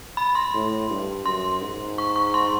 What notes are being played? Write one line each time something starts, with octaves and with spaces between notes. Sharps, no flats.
B5
C6
A2
G2
F#2 C6
G#2
C#6
C#6
C6